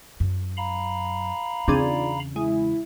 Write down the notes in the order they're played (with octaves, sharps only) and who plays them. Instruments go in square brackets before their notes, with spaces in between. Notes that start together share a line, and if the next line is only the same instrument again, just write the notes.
[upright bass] F#2
[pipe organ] F5 A#5 B5
[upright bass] E2 C#3 [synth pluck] C4 D4 G#4 [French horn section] D#4 F4 D5
[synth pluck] G#3 [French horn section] E4